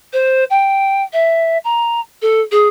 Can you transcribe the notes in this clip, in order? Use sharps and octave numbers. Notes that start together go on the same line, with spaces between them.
C5
G5
E5
A#5
A4
G#4